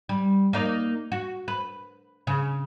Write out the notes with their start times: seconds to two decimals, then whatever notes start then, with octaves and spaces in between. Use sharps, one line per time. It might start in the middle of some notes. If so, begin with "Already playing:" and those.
0.09 G3
0.53 A#3 D#4 D5
1.12 F#4
1.48 B4
2.27 C#3